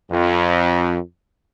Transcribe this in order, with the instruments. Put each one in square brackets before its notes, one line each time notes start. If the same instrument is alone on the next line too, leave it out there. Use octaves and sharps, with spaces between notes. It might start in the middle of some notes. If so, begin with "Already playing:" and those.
[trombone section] F2